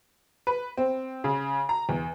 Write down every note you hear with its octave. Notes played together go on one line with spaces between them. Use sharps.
B4
C4
C#3
A#5
E2